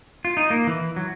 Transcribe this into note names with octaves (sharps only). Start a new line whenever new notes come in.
F4
D#4
A#3
E3
F#3